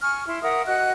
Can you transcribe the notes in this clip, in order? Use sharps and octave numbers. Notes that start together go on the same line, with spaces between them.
G#5 C#6 F6
E4 C6
A#4 E5 F#5 D#6
F#4 D#5 F#5 F#6